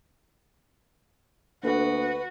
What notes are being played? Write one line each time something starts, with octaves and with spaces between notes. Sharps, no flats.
D2 A#3 D4 F#4 A4 B4